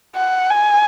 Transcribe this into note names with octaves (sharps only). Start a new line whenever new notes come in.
F#5
G#5